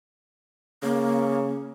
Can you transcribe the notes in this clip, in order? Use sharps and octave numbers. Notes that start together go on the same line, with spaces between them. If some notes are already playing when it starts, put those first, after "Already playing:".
C#3 A#3